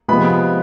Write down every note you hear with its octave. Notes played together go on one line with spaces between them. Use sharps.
C3 F3 G#3 B3 B5